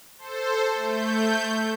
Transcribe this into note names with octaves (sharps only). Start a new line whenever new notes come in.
A4 C5
A3 G6